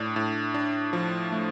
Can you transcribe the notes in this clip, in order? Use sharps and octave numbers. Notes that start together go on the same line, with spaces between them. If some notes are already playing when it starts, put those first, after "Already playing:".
Already playing: A2 D4
A2
D4
F3
A3